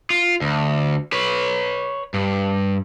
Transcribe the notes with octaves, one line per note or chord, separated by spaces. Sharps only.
F4
D2
B4 C#5
G2